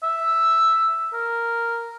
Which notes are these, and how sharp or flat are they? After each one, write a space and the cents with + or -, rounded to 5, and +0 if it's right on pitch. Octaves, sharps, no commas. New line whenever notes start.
E5 +0
A#4 -5